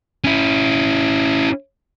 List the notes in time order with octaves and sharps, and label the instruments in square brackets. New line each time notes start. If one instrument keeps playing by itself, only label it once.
[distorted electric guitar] C#4 E4